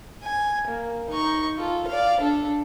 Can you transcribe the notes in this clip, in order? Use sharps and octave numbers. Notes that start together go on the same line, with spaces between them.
G#5
A#3
D#4 C#6
F4 A4
D5 F5
D4 A4